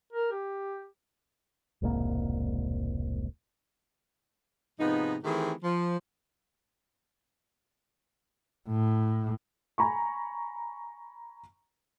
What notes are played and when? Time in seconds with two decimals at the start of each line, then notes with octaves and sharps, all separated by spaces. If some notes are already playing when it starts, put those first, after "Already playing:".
0.13 A#4
0.32 G4
1.82 E1 C2 G#2 A#3
4.79 G#2 C3 F3 B3 D#4
5.24 D#3 E3 A3 C4 G4 G#4
5.63 F3
8.69 A2
9.78 G#5 A#5 B5 C#6